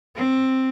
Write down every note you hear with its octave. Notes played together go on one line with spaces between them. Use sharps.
C4